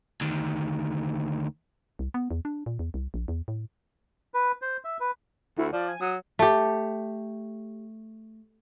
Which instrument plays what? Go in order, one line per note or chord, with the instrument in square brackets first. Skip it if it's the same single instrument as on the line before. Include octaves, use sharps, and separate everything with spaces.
[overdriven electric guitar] D2 D#3
[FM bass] C2
B3
E2
D4
A#2
E2
C2
A#1
E2
A2
[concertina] B4
C5
E5
B4
[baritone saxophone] D2 [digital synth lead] E4
[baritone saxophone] F3 [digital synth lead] D5
[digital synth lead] G#5
[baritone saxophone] F#3 [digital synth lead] D#6
[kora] A3 G4